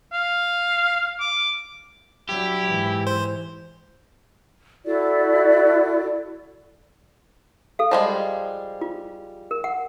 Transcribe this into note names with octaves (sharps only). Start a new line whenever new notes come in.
F5
D6
F#3 D4 E4 G4
G#2 E3
C5
E4 F#4 A4 D5
A4 F5
F3 G3 G#3
F4
A#4
F#5